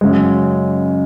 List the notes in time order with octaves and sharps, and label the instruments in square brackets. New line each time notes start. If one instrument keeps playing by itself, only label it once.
[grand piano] F#2 C#3 G#3